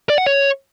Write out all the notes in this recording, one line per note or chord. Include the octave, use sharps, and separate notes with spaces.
D5
F#5
C#5